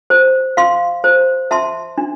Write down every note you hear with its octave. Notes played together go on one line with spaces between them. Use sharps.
C5
F5 C6
C5
E5 A5 C6
D4